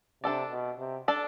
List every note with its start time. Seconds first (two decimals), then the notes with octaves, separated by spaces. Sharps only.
0.23 C3 D4 A4 D5
0.51 B2
0.79 C3
1.08 D4 A4 D5